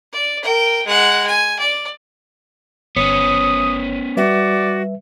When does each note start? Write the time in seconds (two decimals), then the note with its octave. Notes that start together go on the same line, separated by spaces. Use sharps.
0.12 D5
0.43 A#4 G5
0.86 G#3 F#5
1.27 G#5
1.59 D5
2.96 G1 B3 C#4 C#5 D#6 C#7
4.17 G3 F#4 B4 D5 E5